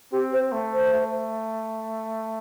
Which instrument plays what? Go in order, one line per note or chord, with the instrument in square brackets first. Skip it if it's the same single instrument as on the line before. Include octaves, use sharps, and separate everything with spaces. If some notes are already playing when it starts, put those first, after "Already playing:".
[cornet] C4 [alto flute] G4
[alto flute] C5
[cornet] A3
[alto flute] C5
[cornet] A3